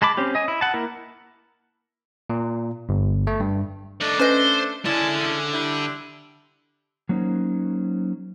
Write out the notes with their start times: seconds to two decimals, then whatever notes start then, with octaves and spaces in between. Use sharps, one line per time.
0.02 G#3 A5 B5 D6
0.17 C4 C#4 G4
0.35 D#5 G#5
0.48 E4
0.61 F#5 A5
0.74 A#3 E4 A#4
2.30 A#2
2.89 G1
3.27 A3
3.40 G2
4.01 A3 D4 D#4 D5
4.19 C#4 B4 C5 D#5
4.85 D3 G#3 C#4 E4 D5 A5
5.53 G3 D4 E4
7.09 F#3 A#3 C#4 D#4 C5